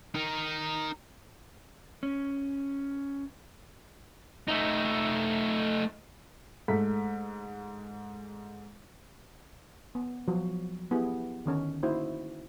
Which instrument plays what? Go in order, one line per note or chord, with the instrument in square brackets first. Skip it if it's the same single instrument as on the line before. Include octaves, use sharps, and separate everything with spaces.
[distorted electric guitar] D#4 A#4
[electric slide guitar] C#4
[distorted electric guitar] A3 D#4
[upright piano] G#2 A3 B6
[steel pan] B3
F3 F#3 F#4
B3 E4 G4 G#4
D3 D#3 C#4
A#3 D#4 E4 F#4 C5